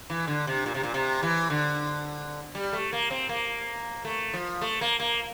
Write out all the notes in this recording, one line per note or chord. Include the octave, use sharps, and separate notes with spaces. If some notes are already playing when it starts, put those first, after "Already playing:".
E3
D3
C3
A#2
C3
A#2
C3
E3
D3
G3
A3
A#3
C4
A#3
A3
F3
A3
A#3
A#3